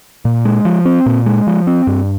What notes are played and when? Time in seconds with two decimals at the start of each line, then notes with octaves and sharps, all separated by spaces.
0.25 A#2
0.45 G#3
0.65 F3
0.85 C4
1.06 A#2
1.26 G#3
1.47 F3
1.67 C4
1.87 G2